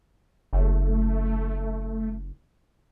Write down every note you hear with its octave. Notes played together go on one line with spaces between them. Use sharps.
F#1 A3